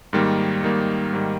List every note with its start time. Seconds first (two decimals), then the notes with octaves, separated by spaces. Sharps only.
0.13 G#2 D#3 G3 A#3
0.63 G#2 D#3 G3 A#3
1.13 G#2 D#3 G3 A#3